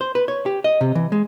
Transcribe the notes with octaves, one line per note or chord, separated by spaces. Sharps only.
C5
B4
C#5
G4
D#5
C3
E3
G#3